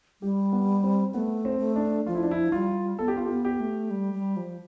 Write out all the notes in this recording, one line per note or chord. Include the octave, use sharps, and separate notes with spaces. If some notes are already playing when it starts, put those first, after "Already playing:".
G3 G4
B3
C4
A3 B3
C4
A3
D4
F3 F4
E4
D4
E4
G3 F4
B3 A4
G4
F4
B3 G4
G4
A3
G3
G3
F3